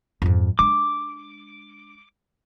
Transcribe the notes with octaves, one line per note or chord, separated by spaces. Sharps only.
F2 G#2
G#3 D4 D6